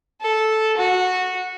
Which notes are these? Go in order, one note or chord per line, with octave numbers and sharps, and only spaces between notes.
A4
F#4